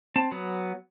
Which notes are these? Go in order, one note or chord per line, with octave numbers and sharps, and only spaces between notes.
C4 A5
F#3 B3